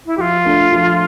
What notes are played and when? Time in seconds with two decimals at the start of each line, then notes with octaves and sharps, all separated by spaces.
0.06 E4
0.17 F3 F4 G4
0.45 A3 D4
0.73 F3